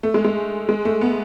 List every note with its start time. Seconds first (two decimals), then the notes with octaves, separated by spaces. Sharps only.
0.03 A3
0.14 G#3
0.24 G#3
0.69 G#3
0.85 A3
1.01 B3